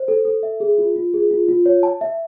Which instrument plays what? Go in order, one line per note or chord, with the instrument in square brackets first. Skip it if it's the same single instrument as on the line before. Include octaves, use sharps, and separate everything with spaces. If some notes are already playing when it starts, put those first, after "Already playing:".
Already playing: [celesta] C5
A4
A4
E5
G#4
F4
F4
G#4
F4
F4
C#5
A5
E5